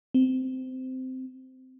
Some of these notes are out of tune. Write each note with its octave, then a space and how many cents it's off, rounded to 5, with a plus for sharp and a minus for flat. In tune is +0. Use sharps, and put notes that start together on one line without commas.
C4 -15